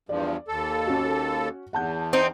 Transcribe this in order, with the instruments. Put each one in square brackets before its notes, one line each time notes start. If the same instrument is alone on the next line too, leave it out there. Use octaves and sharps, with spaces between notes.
[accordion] E2 G2 F3 [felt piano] D5
[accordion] D#2 A4
[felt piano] C#4 F#4
[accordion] E2 [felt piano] F#5 A5 G6
[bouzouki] C4 D#4